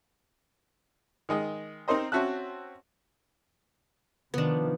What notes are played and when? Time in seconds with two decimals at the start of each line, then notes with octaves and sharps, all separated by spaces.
1.29 D#3 G#3 D#5
1.88 C4 D#4 A#4 C5 D#5
2.12 C4 C#4 F#4 E5 A5 F#6
4.34 C3 D#3 F3 B3 D4